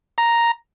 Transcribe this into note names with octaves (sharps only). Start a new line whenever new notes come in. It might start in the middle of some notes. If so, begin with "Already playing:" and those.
A#5